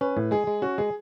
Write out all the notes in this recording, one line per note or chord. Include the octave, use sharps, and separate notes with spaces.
C#4 B4
A2
G#3 G#4
G#3
C#4 F#4
G#3 G#4